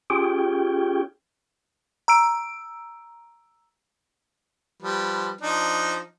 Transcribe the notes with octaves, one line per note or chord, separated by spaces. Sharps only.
C#4 F4 G4 G#4 G5
A#5 E6 D7
F3 G3 B4
F3 D4 D#4